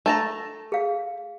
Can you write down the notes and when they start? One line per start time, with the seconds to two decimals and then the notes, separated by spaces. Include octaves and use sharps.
0.06 A3 A5 A#5
0.72 G#4 F5